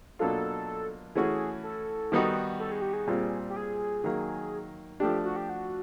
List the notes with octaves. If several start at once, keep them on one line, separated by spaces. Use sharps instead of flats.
B2 F#3 A#3 D4 F4 A4
E3 A3 C#4 F#4 G#4
A4
D#3 G3 B3 D#4 F#4
A4
G#4
G4
G#4
A#2 G3 C4 F4
G4
G#4
D#3 F#3 A#3
F3 A3 D4 G4
F#4
G4
F#4